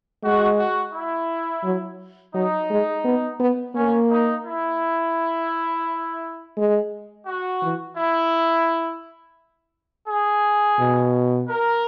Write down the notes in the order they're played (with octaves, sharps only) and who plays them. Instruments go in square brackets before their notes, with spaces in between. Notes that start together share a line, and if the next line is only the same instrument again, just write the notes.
[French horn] G#3 [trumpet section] F#4
[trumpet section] F#4
E4
[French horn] F#3
[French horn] F#3 [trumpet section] D#4
[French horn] G#3
B3
B3
[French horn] A#3 [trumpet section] C#4
[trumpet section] D#4
E4
[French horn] G#3
[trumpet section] F#4
[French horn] E3
[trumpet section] E4
G#4
[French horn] B2
[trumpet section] A#4